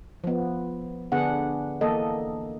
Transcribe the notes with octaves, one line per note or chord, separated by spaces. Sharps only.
F3 B3
D3 B3 D4 G#4 F#5
E3 A#3 A4 D#5